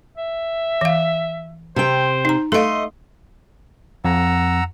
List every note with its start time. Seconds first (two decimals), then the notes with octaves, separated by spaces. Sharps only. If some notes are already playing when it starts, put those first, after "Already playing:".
0.18 E5
0.81 E3 F5
1.76 C3 C5 G5
2.25 D#4 A#5
2.52 A3 A4 D#5 F5 C6
4.05 F2 F#5 A#5 E6